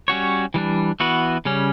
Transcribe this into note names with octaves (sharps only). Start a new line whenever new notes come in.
G3 C#4 F#4 C#5
E3 G3 D4
E3 B3 F#4 B4
C#3 G3 C#4